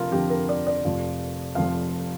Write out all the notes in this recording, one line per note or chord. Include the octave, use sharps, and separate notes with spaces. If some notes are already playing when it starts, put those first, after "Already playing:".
Already playing: F1 F2 D3 F3 F4 A#4
F1 F2 D3 F3 G4
A#4
D5
D5
F1 F2 F3
F1 F2 F3 F5